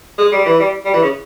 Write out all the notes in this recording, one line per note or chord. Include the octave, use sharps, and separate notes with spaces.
G#3
G3
E3
G3
G3
E3
C#3